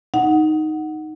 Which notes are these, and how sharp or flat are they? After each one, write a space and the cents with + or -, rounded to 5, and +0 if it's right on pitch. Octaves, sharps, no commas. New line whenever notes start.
D#4 +0 F#5 +0